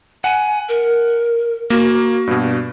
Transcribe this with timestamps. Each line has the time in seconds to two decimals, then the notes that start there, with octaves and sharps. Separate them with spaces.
0.24 F#5 G#5
0.69 A#4
1.70 A#3 F#4
2.27 G2 B2